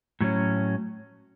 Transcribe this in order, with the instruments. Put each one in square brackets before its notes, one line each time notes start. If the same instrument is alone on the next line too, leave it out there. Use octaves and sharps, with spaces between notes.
[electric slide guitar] A2 F#3 C#4